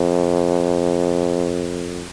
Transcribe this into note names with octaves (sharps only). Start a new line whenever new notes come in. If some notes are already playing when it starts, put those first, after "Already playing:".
Already playing: F2